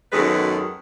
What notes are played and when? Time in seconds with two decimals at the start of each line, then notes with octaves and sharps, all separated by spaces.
0.12 F#2 B2 D#3 G#3 A4 B4